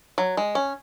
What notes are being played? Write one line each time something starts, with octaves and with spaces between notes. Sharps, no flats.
F#3
G#3
C#4